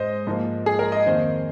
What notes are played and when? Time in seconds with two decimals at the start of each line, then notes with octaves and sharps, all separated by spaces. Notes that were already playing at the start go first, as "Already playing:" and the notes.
Already playing: G#2 G#3 C5 D#5
0.27 G#2 F3 A#3
0.66 G#4
0.79 A#4
0.92 D#5
1.06 F2 D#3 A#3 C5